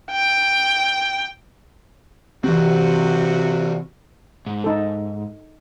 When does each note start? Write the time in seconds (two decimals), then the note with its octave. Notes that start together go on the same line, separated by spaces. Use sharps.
0.12 G5
2.44 C3 E3 C4 F#4
4.46 G#2
4.64 D#4 A4